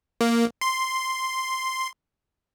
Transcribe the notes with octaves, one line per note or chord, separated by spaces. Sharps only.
A#3
C6